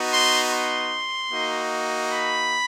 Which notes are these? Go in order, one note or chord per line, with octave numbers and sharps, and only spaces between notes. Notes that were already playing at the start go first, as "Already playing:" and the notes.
Already playing: B3 D#4 F#4
C6
C6
A#3 D#4 F#4
B5